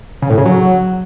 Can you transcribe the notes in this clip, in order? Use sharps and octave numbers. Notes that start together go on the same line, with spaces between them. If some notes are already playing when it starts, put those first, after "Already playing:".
C#3
A2
C#3
F#3